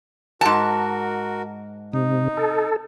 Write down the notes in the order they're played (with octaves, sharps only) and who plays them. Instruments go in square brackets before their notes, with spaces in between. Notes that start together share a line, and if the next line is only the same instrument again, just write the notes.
[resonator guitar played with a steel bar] G#2 A5 [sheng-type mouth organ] F#4 A#4
[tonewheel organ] C3 [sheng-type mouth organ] D#4
[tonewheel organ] A4